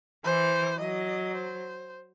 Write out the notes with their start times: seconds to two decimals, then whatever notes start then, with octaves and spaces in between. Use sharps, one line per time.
0.25 E3 C5
0.80 F#3 D#5
1.35 C5